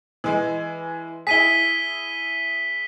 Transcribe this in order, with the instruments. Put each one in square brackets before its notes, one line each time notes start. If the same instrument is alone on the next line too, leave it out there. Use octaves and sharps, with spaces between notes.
[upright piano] E3 G#3
[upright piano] E4 G#4 [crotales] B6 D#7 G7